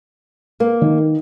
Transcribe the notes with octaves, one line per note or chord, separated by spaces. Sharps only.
A#3
D#3